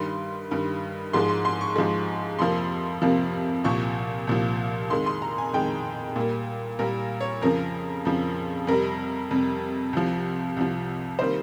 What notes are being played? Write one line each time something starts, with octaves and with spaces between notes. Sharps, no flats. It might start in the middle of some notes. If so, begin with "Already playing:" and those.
Already playing: G2 D#3 G3 C6
G2 D#3 G3
G#2 F3 G#3 C6
C6
C6
C#6
G#2 F3 G#3
F2 C3 F3 A#3 C6
F2 C3 F3 A#3
C2 A#2 F3 C#6
C2 A#2 F3
F2 D#3 G#3 C6
C6
A#5
G#5
F2 D#3 G#3 G5
A#2 G3 A#3
A#2 G3 A#3 A#4
C#5
F2 C#3 F3 A#4
F2 C#3 F3
F2 C3 G3 A#4
F2 C3 G3
C2 C3 F3
C2 C3 F3
C3 D#3 G3 A#3 C5